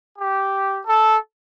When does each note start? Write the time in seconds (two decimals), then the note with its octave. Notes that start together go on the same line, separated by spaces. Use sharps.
0.19 G4
0.86 A4